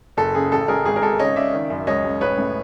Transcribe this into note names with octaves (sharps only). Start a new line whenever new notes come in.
F#1 A4
C#3 G#4
A1 A4
A1 G#4 A#4
G#1 G#4
A#4
G#1 A4
C#3 C#5 D#5
C#3 D5 E5
D#3
F#2
C#2 C#5 D#5
C#2
A1 B4 C#5
A2